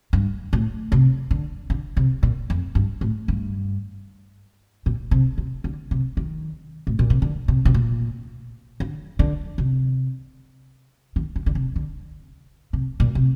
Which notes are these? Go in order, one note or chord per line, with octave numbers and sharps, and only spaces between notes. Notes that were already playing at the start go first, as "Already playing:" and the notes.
G2
A2
C3
D3
D3
C3
A#2
F2
G2
A2
G2
A#2
C3
C3
D3
C3
D#3
A2
A#2
C3
D3
C3
C3
A#2
D3
D3
C3
D#3
D3
D3
C3
D3
C3
A#2
C3